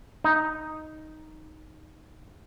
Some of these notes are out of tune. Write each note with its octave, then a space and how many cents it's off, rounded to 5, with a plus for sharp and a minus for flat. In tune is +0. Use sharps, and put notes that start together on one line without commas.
D#4 +0